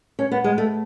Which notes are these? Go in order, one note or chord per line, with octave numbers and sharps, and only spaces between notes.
C#4
B3
G#3
A3